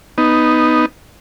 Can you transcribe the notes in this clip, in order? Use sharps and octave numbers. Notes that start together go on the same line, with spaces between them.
B3 D#4